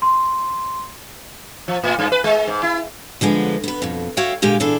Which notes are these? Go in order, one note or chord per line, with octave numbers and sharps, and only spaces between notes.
C6
F3
A2
G2
B4
G#3
G#2
E4
D3 F3 G#3 B3
B3 B4
F2 B2
F#4 C#5 E5 F5 G5
A#2 D3 G#3 G4 F5
A#2 E3 D4 G#4 A4